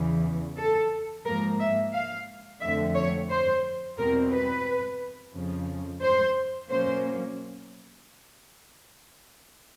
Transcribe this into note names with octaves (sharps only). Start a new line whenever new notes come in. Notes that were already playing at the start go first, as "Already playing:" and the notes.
Already playing: E2 C#3 E3
A4
G#2 F3 A#3 A#4
E5
F5
F2 D3 F3 A3 C4 E5
C#5
C5
E2 B2 G3 C4 A#4
B4
F2 C#3 F3
C5
B2 F#3 A#3 C#4 C5